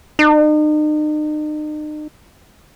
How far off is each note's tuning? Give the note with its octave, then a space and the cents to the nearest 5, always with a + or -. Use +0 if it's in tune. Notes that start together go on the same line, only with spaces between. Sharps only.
D#4 -40